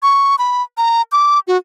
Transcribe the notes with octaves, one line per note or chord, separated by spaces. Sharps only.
C#6
B5
A#5
D6
F#4